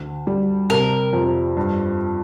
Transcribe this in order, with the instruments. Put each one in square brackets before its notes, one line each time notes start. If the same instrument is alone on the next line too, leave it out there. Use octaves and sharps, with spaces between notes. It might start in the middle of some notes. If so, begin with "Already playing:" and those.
Already playing: [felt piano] D2
G3
[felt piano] C3 [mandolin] A#4
[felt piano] F2
G2